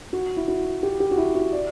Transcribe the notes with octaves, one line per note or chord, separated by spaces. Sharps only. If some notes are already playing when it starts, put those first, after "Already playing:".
F#4
E4
F#4
G4
G4
F#4
E4
F#4
D5